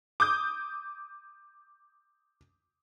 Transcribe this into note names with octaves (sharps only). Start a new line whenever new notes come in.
D6 D#6 G6